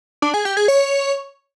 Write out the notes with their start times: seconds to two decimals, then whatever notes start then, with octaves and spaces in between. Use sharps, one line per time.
0.22 D4
0.34 G#4
0.45 G4
0.57 G#4
0.68 C#5